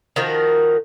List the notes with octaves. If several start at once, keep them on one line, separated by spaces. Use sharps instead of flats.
D#3 F3 F#4 A#4